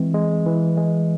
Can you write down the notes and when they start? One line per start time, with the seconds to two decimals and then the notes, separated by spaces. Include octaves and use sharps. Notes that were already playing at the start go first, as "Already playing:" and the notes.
Already playing: E3 G#3 C4
0.14 G#3
0.46 E3
0.77 G#3